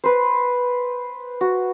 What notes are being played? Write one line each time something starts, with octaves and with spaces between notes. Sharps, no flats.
B4 C5
F#4